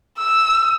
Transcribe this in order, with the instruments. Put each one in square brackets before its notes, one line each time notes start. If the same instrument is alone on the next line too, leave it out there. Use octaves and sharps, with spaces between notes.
[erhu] E6